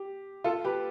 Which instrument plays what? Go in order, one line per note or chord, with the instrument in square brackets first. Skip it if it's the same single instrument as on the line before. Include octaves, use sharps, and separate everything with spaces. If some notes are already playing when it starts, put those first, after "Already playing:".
Already playing: [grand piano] G4
F4 A4
G4 B4